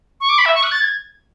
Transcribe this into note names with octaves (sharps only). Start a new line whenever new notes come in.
C#6
D6
B5
E5
C#6
F#6
A6
G#6